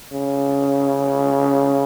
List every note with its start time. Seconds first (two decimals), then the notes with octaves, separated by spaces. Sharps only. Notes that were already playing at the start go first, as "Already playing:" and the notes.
0.13 C#3